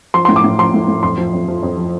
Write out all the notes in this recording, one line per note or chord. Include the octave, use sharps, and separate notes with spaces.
F3 C6
A2 C6
D6
A2
F3 C6
A2
A2
F2 C6
F3
F2
F3
F2
F3